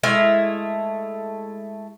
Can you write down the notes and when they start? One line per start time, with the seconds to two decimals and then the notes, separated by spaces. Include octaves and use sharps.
0.03 G#3 A3 E4 F5